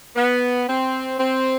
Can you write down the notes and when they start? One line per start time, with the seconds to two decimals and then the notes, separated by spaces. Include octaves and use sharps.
0.16 B3
0.68 C4
1.18 C4